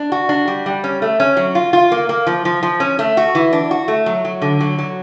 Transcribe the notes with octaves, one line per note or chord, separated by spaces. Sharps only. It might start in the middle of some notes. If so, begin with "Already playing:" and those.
Already playing: D4
F#4
D4
G3
G3
C#4
A3
C#4
F#3
F4
F4
A#3
A#3
F3
F3
F3
C#4
A3
F#4
E3
D4
F#4
A3
F#3
F#3
D3
F#3
F#3